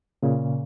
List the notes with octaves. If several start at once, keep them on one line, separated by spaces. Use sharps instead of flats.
A#2 C#3